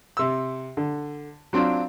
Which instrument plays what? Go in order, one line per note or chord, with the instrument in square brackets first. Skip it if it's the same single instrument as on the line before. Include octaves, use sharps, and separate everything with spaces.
[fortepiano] C3 E6
D3
F#3 C4 D4 F4